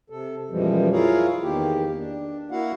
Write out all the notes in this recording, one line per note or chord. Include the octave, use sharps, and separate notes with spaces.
C3 A4
F#2 B2 E3 F3 G3 G#3
E4 F4 G#4 A#4 C#5 F5
E2 D#3 A#3 G4
D4
A#3 E4 F#4 F5 F#5